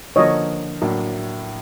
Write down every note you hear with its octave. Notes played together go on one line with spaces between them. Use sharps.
D3 F3 A#3 C#5 D#5
A2 F#3 A#3 D4